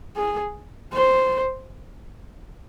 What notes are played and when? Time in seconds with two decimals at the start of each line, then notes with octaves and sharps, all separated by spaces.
0.16 G#4
0.93 C5